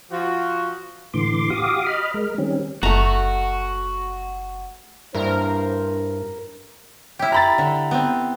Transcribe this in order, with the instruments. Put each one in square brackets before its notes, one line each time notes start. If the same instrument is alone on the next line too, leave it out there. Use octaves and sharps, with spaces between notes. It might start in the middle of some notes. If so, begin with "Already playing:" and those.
[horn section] F3 F#4
[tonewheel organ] A2 D3 E3 C6 D6
F#4 G4 F5 D6 D#6
D#5 B5 F6
G#3 A#4
D#3 G3 C4 C#4
[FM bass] F#1 [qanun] A3 A#5 [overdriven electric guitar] F#4
[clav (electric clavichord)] G2 E4 A#5 [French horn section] D4 C5 [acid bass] A#4
[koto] E4 G4
[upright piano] A#5 B5 A6
[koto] D3
B3 C4